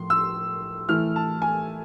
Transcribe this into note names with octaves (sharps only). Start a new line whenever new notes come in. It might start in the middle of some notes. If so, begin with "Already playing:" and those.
Already playing: A2 F3 C6
E6
E3 A3 E4 F6
A5
G#5